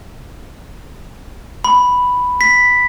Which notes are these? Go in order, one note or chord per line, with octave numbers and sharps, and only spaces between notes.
B5
B6